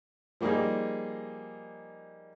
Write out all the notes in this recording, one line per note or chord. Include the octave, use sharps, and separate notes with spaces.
F3 G3 A#3 D#4 G#4